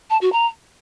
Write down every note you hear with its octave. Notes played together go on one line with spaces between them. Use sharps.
A5
F#4
A#5